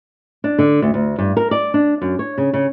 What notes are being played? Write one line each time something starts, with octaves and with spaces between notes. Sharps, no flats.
D4
D3
D2
D2
G2
A#4
D5
D4
F#2
C#5
C#3
C#3